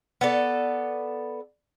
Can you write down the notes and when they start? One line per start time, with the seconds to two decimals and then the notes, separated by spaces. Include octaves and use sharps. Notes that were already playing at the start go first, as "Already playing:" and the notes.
0.21 B3 A4 D5